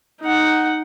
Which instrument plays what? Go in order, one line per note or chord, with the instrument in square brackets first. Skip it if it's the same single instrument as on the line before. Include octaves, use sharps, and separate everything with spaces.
[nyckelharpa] D#4 F#5